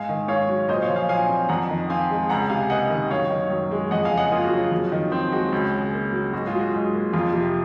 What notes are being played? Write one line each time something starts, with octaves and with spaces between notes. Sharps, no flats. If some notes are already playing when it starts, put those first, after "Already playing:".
Already playing: G#2 F5 G#5
D#3
G#2 C#5 F5
F#3
A#2 C5 D#5
C#5 F5
F3
F5 G#5
A#2 F5 G#5
C4
F2 F#5 A#5
D#3
C4 F5 G#5
G#3
C#2 F#5 A#5
C3 F5 G#5
A#3 D#5 F#5
D#3
F#2 C#5 F5
D#3
F#2
G#3
F2 D#5 F#5
F5 G#5
C#3
D#5 F#5
A#3 F4 G#4
F#4
F#3
F4
F2
D#3
C4
G#3 F#4
C#2
C#3
A#3
F#3
G#2 F#4
F4 G#4
F#3
F#4
G#2 F#4
A#3
F2 F4
C3